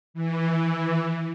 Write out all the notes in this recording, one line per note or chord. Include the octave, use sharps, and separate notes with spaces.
E3